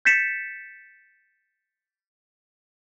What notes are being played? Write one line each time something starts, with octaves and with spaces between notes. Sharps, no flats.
G6 A6 B6 C#7 E7